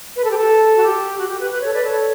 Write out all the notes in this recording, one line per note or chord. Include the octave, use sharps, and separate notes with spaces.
B4
A4
G4
A4
F#4
G4
F#4
G4
B4
B4
A4 C#5
B4 D5
A4 C#5